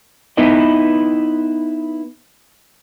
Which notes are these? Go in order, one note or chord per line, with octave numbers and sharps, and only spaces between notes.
B3 D#4 E4 B4 D#5